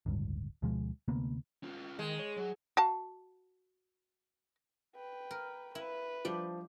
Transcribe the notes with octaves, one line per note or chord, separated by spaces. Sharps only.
D1 G1 C#2 G2
D2 B2 F3 G#3
D2 C3 A#3 B3
C#4 F4
D#3 G#3
C#5
F#3
F#4 F5 A5
B4 G5
A#4
E4 B4
F3 G3 D4